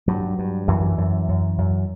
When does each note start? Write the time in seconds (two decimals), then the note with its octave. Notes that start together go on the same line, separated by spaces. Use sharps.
0.08 G2 F#3
0.39 G2
0.68 F#2 E3
0.98 F#2
1.28 F#2
1.58 F#2